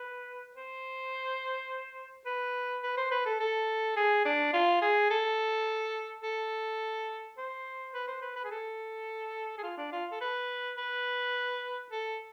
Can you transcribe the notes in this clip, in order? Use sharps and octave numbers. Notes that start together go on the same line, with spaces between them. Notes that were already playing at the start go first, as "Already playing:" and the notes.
Already playing: B4
C5
B4
B4
C5
B4
A4
A4
G#4
D4
F4
G#4
A4
A4
C5
B4
C5
B4
B4
G#4
A4
G#4
F4
D4
F4
A4
B4
B4
A4